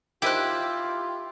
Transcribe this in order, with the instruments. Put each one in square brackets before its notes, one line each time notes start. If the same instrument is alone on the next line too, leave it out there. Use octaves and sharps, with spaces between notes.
[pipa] D#3 C5 [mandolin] E4 D#6 F#6 [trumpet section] F4 [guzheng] G4